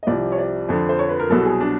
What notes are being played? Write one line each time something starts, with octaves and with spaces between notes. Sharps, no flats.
D#5
C2 C3 F3 D5
C#5
D5
F2 D3 F3
C5
C#5
B4
A#4
C2 B2 F#3 A4
G#4
D4